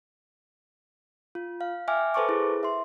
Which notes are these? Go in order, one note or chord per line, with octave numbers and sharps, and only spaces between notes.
F4
F5
E5 G5 G#5 D6 F6
A4 B4 C5 A5 C#6 D6
E4 G#4
E5 C6